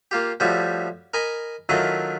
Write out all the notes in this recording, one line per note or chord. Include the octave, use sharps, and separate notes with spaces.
A#3 F4 G4
A2 F3 G3 E4 F#4
A#4 D#5 G#5 B5
D#3 F#3 A3 E4 F4 D#5